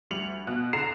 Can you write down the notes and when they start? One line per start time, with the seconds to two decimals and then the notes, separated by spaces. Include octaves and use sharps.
0.11 D2 G3 C#7 F7 F#7
0.47 B2 F#6
0.73 E2 D3 A#5 C7 E7